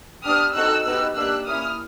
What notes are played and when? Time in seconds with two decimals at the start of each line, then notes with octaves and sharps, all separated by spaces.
0.24 B3 D4 G4 D#6 F6
0.54 C4 D#4 F#4 A4 E6 F#6
0.85 B3 D#4 G4 E6 F#6
1.15 A#3 D4 G4 E6 F#6
1.46 A#3 C#4 E4 D#6 F6